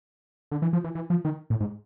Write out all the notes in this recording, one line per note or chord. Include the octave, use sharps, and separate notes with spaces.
D3
E3
F3
E3
E3
F3
D#3
A2
G#2